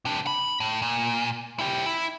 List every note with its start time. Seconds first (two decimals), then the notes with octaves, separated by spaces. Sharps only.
0.05 C3 D4
0.27 B5
0.60 A2
0.82 A#2
1.59 E4 G4
1.86 E4